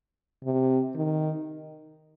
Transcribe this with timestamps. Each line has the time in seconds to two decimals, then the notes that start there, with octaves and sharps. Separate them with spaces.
0.44 C3
0.95 D#3